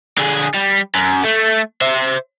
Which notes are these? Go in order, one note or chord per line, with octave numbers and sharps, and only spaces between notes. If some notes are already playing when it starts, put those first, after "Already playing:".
D3 G#4
G3
F#2
A3
C5 E5